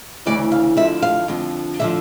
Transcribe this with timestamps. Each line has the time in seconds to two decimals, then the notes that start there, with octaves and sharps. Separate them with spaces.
0.25 D2 C#3 E3 D5
0.52 F5
0.77 F2 D3 F3 E5
1.02 F5
1.28 F2 D3 F3
1.80 D3 F3 E5